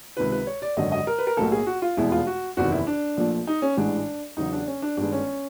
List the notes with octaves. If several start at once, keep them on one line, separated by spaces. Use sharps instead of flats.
C#2 C3 D#3 B4
B4
C#5
D5
G#1 F#2 D3 F#3 D#5
D#5
A#4
B4
A#4
B1 A2 F#3 A#3 A4
G#4
F#4
F4
F1 E2 B2 G#3 B3 E4
F4
F#4
F#1 E2 C3 D#3 F#4
E4
D4
A#1 A#2 F3 A3
D#4
C#4
A1 G#2 E3 G#3 D4
E2 C#3 F#3 D#4
D4
C#4
D4
G1 G2 D#3 G#3 D4
C#4